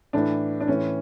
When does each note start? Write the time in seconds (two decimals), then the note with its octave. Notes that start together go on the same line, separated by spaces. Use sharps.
0.13 A2 E3 D4
0.60 D4
0.68 A2 E3 C#4